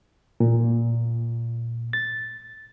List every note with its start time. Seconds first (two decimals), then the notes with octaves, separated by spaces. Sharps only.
0.40 A#2
1.93 A6